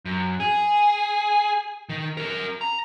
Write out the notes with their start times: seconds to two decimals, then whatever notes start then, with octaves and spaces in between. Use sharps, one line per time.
0.05 F#2
0.40 G#4
1.89 D#3
2.17 C#4 A#4
2.61 A#5